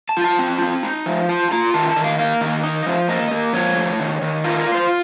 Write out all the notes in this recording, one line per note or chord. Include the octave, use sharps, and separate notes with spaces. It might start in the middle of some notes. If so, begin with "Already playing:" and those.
A5
F4
A5
C4
C4
D#4
F3
F4 A5
F4 A#5
D#3 A5
A5
D#3
F5
A#3 F5
D#3
D#4
F3
A#3 D#5
A#3
F3 C#5
A3
D#3
D#3
F4 A#4
A#4
F4
C5